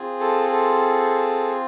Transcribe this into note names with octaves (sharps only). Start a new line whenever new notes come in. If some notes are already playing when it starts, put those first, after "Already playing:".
Already playing: C4 F4 G#4
A4
A4